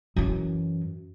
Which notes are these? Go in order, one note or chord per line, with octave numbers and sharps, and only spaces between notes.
F#2 E3